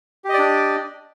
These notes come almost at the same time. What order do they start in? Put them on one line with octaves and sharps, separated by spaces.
G4 D#5 D5 D4